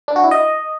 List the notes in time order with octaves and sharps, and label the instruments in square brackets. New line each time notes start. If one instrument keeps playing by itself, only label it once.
[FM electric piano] D4
F#4
E4
D#5